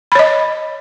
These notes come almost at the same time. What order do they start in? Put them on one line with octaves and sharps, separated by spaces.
B5 C#5 D#5